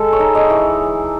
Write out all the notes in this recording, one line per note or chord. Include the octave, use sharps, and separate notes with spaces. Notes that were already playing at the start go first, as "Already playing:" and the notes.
Already playing: G#3 A4
C#5
D#4
D#5
E3